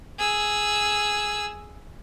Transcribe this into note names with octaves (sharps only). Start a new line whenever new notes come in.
G#4 E6